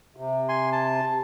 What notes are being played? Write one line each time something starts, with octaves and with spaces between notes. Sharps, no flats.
C3
G#5 C6
A5